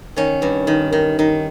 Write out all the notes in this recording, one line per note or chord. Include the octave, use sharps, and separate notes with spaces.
D#3 C#4
G2
D#3
D#3
D#3